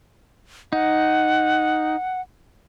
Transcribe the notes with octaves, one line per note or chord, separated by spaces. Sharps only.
D#4 F#5